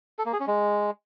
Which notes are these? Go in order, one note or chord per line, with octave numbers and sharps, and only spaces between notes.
A4
A#3
G#4
C#4
G#3